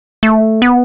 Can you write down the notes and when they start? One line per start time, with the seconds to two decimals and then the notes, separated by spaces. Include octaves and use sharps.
0.23 A3
0.62 B3